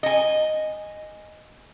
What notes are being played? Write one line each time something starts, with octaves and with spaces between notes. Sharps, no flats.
D#5 G#5